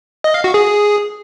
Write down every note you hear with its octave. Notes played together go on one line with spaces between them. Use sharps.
D#5
F5
F#4
G#4